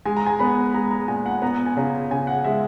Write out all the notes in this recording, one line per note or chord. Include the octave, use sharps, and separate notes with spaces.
G#3 G#5
A#5
G#5
B3 B5
G#3 A#5
A#5
A#2 G#5
F#5
B3 A#5
G#5
C#3 A#5
C#3 G#5
F#5
G#3 E5